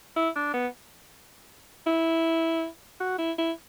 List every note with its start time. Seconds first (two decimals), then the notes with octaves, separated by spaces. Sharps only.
0.16 E4
0.36 D4
0.54 B3
1.87 E4
3.01 F#4
3.19 E4
3.38 E4